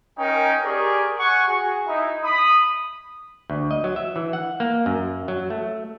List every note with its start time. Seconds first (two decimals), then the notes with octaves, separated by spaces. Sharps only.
0.18 C#4 D#4 A#4 G5
0.64 G4 G#4 A#4 D5 C#6
1.18 F#5 G#5 C#6
1.47 F#4 G#4
1.88 D#4 E4
2.24 B5 D#6
3.50 D2
3.71 D#5
3.84 F#3
3.96 E5
4.16 E3
4.33 F#5
4.60 A#3
4.86 F#2
5.28 F#3
5.50 A3